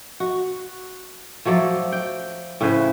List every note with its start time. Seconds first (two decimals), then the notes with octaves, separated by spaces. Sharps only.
0.20 F#4
1.45 F3 F#3 A3 D5
1.92 G5
2.61 A2 C#3 B4 C5